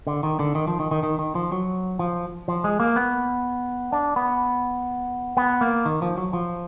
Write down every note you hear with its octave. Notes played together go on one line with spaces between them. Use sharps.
D3
D#3
D3
D#3
F3
D#3
D#3
D#3
D#3
F3
F#3
F3
F3
G#3
A#3
B3
D4
B3
B3
A#3
D#3
F3
F#3
F3